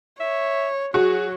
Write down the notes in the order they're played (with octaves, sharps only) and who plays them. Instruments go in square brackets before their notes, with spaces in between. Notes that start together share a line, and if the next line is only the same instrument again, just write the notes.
[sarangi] C#5 [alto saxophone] E5
[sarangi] F#3 [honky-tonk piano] F#4 [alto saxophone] G#4